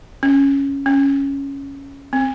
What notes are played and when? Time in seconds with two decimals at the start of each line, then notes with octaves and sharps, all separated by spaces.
0.23 C#4
0.86 C#4
2.13 C4